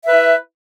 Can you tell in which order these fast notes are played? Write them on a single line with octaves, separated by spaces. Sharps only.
E5 B4 E4